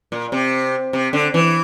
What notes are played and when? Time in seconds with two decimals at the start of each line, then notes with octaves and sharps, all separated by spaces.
0.12 A#2
0.32 C3
0.93 C3
1.13 D3
1.34 E3